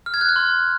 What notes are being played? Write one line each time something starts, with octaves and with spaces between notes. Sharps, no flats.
F6
G#6
F#6
F6
C6